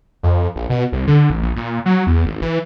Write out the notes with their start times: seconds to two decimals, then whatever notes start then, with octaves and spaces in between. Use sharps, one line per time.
0.23 F2
0.56 A#1
0.70 B2
0.92 C2
1.07 D3
1.30 A1
1.42 A#1
1.56 A#2
1.86 F#3
2.07 E2
2.25 G#1
2.42 E3